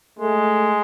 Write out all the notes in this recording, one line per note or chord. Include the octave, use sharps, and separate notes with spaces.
G#3 A3